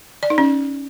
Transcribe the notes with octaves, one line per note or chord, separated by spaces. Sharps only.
D5
D#4
C#4